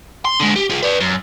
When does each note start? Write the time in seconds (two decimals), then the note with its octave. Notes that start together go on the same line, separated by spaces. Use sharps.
0.25 C6
0.40 D3 G#3
0.56 G4
0.70 F4 G#4
0.83 B4 D5
1.00 F#2